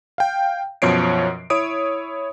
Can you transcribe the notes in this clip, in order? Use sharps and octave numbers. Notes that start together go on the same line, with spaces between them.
F5 G5
F#2 B2 F3 C#5 C7 D7
E4 C#5 D#6 D7